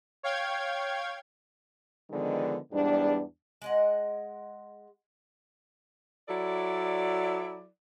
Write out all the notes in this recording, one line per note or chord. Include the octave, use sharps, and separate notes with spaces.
C#5 F5 G5 G#6
D3 D#3 F3 G#3 B3 D4
E2 G#2 G3 B3 D4
G#3 D#5 F#5
F#3 E4 A4 D5